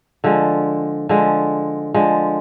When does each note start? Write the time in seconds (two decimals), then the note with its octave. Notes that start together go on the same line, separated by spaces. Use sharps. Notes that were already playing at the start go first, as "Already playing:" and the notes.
0.24 D3 F3 G#3
1.09 D3 F3 G#3
1.94 D3 F3 G#3